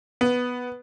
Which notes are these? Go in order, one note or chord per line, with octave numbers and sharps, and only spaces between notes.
B3